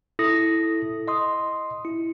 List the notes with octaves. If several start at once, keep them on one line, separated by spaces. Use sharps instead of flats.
E4 A4 D#6 A#6
D#5 C6 D#6
E4